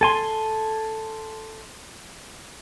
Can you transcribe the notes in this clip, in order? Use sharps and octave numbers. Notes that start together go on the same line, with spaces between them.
A4 G#5 C6